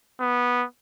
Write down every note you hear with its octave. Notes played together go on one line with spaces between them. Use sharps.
B3